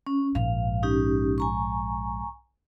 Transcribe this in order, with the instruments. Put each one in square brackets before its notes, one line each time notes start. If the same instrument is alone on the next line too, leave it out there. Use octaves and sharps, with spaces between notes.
[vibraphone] C#4
[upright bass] A#1 G#2 [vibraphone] F5
[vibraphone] C#4 D#4 G4
G#5 A#5 C#6